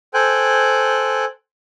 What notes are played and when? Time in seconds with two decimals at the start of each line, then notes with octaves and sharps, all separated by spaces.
0.14 A4 C5 G5 G#5 F#6